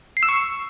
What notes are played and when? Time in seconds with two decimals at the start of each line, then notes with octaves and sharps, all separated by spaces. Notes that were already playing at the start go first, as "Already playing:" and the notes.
0.17 C7
0.23 E6
0.29 C#6